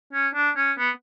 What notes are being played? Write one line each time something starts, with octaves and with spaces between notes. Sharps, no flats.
C#4
D4
C#4
B3